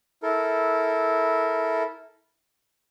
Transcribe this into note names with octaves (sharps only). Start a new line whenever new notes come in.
E4 A4 A#4